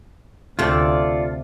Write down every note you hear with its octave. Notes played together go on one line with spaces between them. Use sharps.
D2 C3 A3 F4 A4 D5